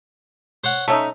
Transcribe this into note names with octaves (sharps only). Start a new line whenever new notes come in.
C5 C#5 F#5
A3 C#4 D#4 E5